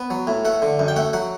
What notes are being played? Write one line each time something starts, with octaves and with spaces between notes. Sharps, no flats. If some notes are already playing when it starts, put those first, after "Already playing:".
Already playing: B3
F#3
A2
A3 F#5
D3
F#2
G5
A3 F#5
F#3 F#5